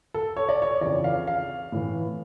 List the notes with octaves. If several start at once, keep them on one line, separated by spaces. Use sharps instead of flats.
A4
C#5
D5
C#5
F2 C#3 E3 D5
F5
F5
A2 E3